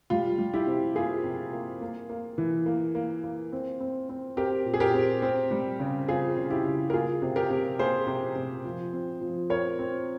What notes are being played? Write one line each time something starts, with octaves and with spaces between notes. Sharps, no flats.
G3 F4
G3
E4 G4
C3
A#3 F4 G#4
C3
A#3
A#3
A#3
E3
A#3
A#3
A#3
C4
C4
C4
C4 G4 A#4
A#2
G#4
G4 A#4
C4
C4
G3
C#3
C4 F4 G#4
C#3
E4 G4
C#3
A#4
A#3 F4 G#4
C3
G4 A#4
C3
A#3 G#4 C5
C3
C3
F3
C4
F3
C4 A#4 C#5
C4